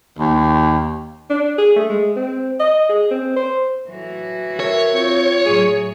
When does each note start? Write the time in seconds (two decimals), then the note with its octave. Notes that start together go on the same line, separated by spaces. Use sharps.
0.19 D#2
1.30 D4
1.58 G#4
1.76 A3
1.89 G#3
2.16 C4
2.60 D#5
2.89 G#4
3.11 C4
3.36 C5
3.89 A2 E3 F#3 F#4
4.60 A#4 C#5 E5
4.94 C4 F4
5.46 A2 F#3 G#4